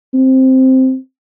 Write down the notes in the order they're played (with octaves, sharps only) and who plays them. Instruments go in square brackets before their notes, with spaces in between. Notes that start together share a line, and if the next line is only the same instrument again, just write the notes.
[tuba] C4